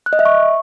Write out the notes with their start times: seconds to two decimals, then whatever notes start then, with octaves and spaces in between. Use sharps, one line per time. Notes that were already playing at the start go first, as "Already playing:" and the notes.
0.06 F#6
0.13 D#5
0.19 E5
0.25 C#6